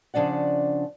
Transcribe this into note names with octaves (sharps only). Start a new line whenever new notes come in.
C#3 F3 D4 D5 F#5